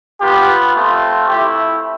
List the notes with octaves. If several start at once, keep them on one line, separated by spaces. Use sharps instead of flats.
B3 F4 G4
A3 C4 F4
A3 C4 E4 G4